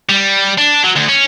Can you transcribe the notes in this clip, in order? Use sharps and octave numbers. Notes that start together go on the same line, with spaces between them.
G3
D4
F#3
D2
C#4